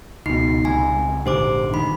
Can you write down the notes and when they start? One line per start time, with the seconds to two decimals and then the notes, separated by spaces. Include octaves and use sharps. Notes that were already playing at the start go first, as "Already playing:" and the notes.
0.26 C#2 B2 D#4 C7
0.65 C#2 C3 G#5
1.26 A#1 G#2 D3 G4 C5 D6
1.74 G1 D#3 B5